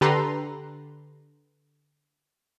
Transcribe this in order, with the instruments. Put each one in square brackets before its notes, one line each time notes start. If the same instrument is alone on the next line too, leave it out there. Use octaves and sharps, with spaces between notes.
[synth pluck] D3 G4 A4 B4 A#5 C6